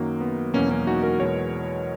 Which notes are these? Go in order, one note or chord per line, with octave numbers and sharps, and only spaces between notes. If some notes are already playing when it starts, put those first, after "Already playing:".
Already playing: F#2 D#3 F#3 A#3
B3
E2 B2 F#3 A#3 C#4
A#3 C#4
D#4 F#4
F#4 A#4
E2 B2 G#3 A#4 C#5